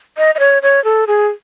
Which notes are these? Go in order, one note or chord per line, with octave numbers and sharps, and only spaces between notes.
D#5
D#5
C#5
C#5
A4
G#4